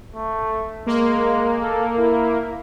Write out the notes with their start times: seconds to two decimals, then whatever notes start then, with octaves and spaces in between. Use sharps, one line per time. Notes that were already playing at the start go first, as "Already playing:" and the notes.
0.14 A3
0.86 G#3 A#3
1.62 A4
1.98 E4